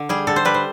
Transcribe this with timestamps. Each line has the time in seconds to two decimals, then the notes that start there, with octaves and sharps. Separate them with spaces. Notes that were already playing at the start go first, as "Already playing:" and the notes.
Already playing: D3
0.09 G3 G#4
0.27 D3 A4
0.36 C5
0.45 G3 B4
0.54 C5